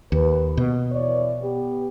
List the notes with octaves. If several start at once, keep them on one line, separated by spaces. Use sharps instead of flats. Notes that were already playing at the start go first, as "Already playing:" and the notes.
D#2 B4
B2
E3 C#5 D5
B3 G4